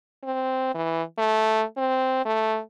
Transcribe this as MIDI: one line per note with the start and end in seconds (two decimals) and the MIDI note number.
0.23 0.70 60
0.74 1.02 52
1.18 1.62 57
1.77 2.25 60
2.25 2.59 57